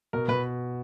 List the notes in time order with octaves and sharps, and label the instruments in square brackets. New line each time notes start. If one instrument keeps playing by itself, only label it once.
[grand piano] B2 [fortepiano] A#4
[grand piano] B2 [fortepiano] B4